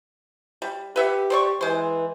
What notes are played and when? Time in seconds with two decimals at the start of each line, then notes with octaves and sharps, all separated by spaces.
0.62 G3
0.96 G4 B4 E5 F#5
1.30 C5 D5 C#6
1.61 E3 G#3 C5